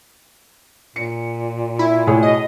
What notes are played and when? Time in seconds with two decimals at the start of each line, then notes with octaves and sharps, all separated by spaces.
0.96 A#2 C#7
1.79 E4
2.07 A2 G#4 C#5
2.23 B2 D#5